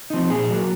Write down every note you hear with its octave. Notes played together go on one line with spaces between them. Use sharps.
F3 C4 D#4
A#2 G#4
F#3 A#3